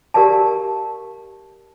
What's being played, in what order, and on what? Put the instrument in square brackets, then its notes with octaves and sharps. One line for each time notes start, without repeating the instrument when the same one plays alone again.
[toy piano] G4 A#4 D5 F5 A5